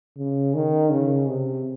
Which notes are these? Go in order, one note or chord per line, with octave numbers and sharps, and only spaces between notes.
C#3
D#3
C#3
C3